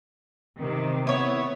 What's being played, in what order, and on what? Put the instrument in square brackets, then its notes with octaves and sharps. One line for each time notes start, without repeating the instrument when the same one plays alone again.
[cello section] C3 D#3
[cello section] B3 [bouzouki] E4 C#5